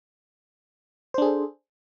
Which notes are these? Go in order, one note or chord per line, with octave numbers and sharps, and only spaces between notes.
D4 G#4 A4 C5